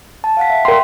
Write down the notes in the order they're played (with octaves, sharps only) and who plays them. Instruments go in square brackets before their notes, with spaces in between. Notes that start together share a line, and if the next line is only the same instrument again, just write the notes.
[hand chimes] A5
F5 F#5 B6
E5
[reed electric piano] A#4 C6 [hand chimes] G5